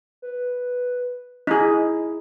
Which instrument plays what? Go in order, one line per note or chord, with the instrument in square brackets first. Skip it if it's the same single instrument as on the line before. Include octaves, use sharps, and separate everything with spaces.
[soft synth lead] B4
[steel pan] D#4 G#4 [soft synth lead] E4